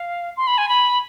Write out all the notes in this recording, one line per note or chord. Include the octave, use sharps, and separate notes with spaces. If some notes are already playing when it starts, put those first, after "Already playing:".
Already playing: F5
C6
B5
G#5
B5